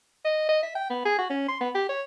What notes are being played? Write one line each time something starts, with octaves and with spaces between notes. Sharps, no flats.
D#5
D#5
E5
G5
B3
G#4
F#4
C#4
C6
B3
G4
C#5